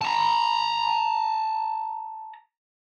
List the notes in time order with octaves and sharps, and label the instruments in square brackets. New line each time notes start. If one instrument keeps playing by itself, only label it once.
[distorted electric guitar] A5 A#5